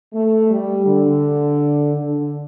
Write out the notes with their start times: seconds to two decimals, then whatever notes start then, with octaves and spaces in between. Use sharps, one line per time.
0.13 A3
0.50 G3
0.86 D3
1.95 D3